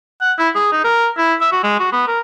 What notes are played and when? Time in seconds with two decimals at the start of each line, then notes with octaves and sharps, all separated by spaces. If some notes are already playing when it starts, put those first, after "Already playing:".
0.21 F#5
0.39 E4
0.55 G#4
0.72 D#4
0.84 A#4
1.18 E4
1.41 E5
1.52 F#4
1.64 G#3
1.79 F#4
1.92 B3
2.07 A#4